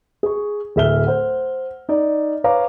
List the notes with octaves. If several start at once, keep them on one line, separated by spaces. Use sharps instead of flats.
G#4 C#6
D1 G#4 E5 F6 G7
C5 F#5
D#4 D5
B4 C#5 F5 A#5 D6